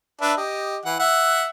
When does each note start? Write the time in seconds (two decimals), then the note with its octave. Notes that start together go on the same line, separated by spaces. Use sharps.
0.21 D4 B4 E5
0.37 G4 D#5
0.85 E3 F#5
0.99 E5 F#5